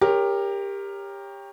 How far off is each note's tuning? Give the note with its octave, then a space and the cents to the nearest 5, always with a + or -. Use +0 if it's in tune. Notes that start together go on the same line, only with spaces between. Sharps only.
G4 +20 A#4 +0 C#5 +0